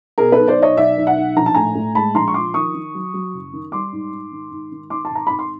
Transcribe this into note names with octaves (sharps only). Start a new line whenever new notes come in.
B2 G#4 A#4
A4 B4
B1
C5 D5
B1 C#5 D#5
B1 D5 E5
B1
E5 F#5
B1
A#1 A#5
A5
A2 G#5 A#5
A2
G#3 A5 B5
A#1 A#5 C6
C#6
F3 C6 D6
D#3 C#6 D#6
D#3
F#3
F#3
F#1
D#3
G3 C6 D6
G#2
G#2
D#3
G#2
D#3
D#3 C6 D6
A5
G#1 A#5
G#1 B5
C6